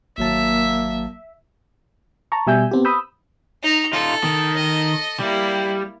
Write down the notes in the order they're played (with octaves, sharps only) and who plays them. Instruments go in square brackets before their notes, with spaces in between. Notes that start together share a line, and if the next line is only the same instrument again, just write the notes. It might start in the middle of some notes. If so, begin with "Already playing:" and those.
[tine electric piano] G#1 F#3 A5 [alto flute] A#3 [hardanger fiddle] E5
[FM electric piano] A5 A#5 C#6
B2 G3 E5 G#5 E6 G6
B3 C4 G4
B5 D#6 E6 G6
[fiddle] D#4 A#5
[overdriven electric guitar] D#4 F4 [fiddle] A4
[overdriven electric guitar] D#3
[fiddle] A4 D#5
[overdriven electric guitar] G3 [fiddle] A#3 E4